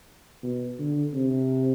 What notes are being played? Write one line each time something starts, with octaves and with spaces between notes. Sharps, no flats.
B2
D3
C3